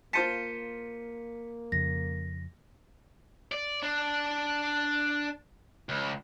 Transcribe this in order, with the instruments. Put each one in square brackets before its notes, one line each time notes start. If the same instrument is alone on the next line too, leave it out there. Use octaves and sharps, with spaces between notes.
[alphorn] A#3 [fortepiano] F4 C5 A5 [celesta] B6 C#7 D#7
[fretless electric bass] F2 C#3 [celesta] A#6
[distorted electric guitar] D5
D4
C#2